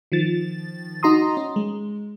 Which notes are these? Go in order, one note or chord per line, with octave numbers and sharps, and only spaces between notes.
D#3 F3 A6
D#4 F#4 A#5 C6 D#6
C#4
G#3